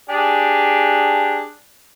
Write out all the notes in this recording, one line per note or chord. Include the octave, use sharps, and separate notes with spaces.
D4 G4 G#4